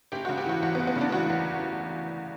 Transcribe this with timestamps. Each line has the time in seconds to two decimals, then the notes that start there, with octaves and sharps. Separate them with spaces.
0.12 F#1 G4
0.25 C#3 F#4
0.37 G4
0.46 E3 F#4
0.62 E2 F#4
0.75 B3
0.79 F#1
0.87 B3
0.95 C#3
1.01 D4
1.12 E3 F#4
1.30 E2